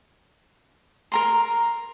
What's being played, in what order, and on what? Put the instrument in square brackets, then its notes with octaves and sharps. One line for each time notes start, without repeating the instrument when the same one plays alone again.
[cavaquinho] A#4 A#5 C6